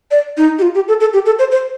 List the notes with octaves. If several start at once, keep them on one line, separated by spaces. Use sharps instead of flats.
D5
D#4
G4
F4
G4
A4
A4
G4
A4
C5
C5